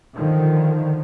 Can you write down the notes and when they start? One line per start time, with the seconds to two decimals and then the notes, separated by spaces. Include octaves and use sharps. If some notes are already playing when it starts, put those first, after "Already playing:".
0.15 D3 D#3 F3